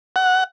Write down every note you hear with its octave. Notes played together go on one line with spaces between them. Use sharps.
F#5